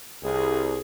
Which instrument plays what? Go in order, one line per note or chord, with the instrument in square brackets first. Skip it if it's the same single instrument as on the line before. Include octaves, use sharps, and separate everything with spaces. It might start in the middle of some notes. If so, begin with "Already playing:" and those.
[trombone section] C2 [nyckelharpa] G#4